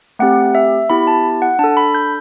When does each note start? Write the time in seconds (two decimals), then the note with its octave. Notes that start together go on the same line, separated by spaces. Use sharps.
0.19 A3 C4 G4 F#5
0.55 E5
0.90 B3 E4 G4 B5
1.07 A5
1.42 F#5
1.59 D4 A5
1.64 A4
1.77 B5
1.95 G6